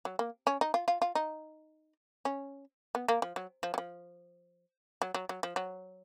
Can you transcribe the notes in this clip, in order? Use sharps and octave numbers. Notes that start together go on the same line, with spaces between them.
F#3
A#3
C#4
D#4
F4
F4
F4
D#4
C#4
B3
A#3
F3
F#3
F3
F#3
F3
F#3
F#3
F#3
F3
F#3